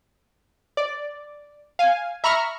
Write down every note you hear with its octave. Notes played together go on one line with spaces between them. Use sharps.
D5
F5 G#5
E5 A#5 B5 C#6 F6